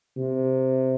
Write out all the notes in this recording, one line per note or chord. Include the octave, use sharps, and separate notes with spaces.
C3